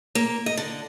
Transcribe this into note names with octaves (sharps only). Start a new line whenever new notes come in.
A#3
D#5
D3